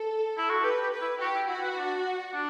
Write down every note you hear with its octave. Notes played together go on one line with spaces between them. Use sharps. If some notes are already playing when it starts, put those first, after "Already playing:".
Already playing: A4
E4
F#4
G4 B4
G4
B4
E4
F#4 G4
E4
E4 F#4
B4
D4
D4